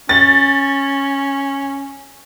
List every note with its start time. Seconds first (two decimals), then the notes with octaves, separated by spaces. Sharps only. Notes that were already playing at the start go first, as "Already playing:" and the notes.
0.09 C#4 A6